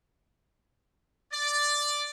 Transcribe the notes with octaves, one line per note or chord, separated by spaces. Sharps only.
D5